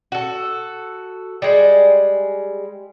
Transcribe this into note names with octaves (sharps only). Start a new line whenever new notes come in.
F#4 A4
G3 G#3